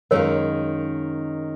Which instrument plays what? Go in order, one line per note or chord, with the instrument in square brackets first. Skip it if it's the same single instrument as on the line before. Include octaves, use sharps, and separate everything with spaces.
[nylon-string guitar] F#2 D#3 G#3 C#4 F4 [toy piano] A#4 C#5